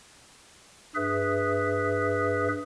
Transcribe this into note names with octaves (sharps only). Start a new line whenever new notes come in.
G2 G#4 B4 E5